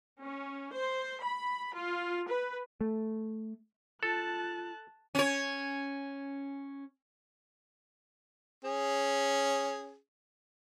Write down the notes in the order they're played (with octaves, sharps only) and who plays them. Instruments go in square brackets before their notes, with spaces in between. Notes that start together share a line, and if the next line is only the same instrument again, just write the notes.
[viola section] C#4
C5
B5
F4
B4
[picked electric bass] A3
[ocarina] F4 [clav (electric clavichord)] A4 [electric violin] A5 F#6
[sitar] C#4 C#5
[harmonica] C#4 G#4